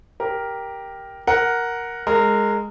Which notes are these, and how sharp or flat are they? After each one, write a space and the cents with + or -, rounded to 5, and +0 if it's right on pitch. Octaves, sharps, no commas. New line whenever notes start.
G4 +0 A#4 +5
A#4 +5 F#5 +0
G#3 +0 A#4 -20